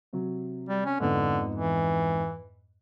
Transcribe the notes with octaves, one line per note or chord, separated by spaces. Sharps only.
C3 F#3
G3
C#4
F2 G#2 D3 B3
E3